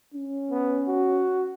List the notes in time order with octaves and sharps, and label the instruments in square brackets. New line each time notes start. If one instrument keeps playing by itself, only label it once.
[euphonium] C#4
[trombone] B3
F#4